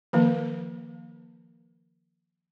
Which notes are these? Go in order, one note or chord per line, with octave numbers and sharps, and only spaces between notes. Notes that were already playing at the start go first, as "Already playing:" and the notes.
D#3 F3 A#3